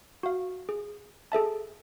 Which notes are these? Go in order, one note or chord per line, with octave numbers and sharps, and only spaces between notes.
F#4 F5
G#4
G#4 A4 E5 A5